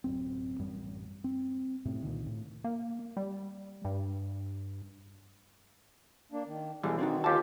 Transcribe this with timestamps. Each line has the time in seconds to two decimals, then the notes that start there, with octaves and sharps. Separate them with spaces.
0.04 D1 F#2 C4
0.59 A1 F#2 G3
1.24 C4
1.85 F#2 A2 C3 A3
2.02 C2 A#2 D3 D#3
2.26 A2
2.64 A#3
3.17 G3
3.85 G2
6.32 A#3 D4
6.47 D#3
6.84 B1 B2 D3 E3 G3 G#4
6.98 D#3 C4 D4 D#4 F#4
7.24 D#2 D3 C#4 F4 G4 A5